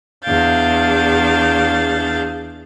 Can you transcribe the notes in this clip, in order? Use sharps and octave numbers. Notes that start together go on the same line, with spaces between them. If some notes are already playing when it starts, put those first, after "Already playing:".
E2 D4 G#4 F5 G6 A6